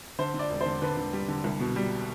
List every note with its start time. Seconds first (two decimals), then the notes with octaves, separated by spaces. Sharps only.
0.19 D3 C5
0.34 D3
0.39 D5
0.50 E1
0.61 D3 C5
0.82 D3 B4
0.97 D3
1.13 G3
1.28 D3
1.44 C2
1.60 B2
1.76 G3